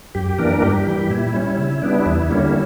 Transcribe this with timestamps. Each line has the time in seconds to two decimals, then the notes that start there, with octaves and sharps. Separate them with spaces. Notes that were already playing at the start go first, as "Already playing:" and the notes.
0.15 F#2 G4
0.39 E3 A#3 D4 A#4
0.63 G2 G4
0.87 E3 G3
1.10 A#2 E4
1.34 G3 C#4
1.58 C#3
1.82 G3 B3 D4
2.06 E2
2.30 D3 G3 A#3 C#4